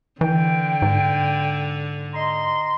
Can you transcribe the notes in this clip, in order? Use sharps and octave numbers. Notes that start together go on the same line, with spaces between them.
D3 E3 G5
G#2
D#5 A#5 C6